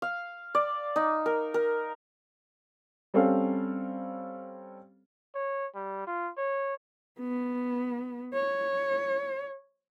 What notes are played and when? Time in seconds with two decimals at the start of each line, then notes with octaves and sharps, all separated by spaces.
0.02 F5
0.55 D5
0.96 D#4
1.26 A#4
1.54 A#4
3.14 G3 C4 C#4 A4 F5
5.35 C#5
5.75 G3
6.07 F4
6.37 C#5
7.20 B3
8.34 C#5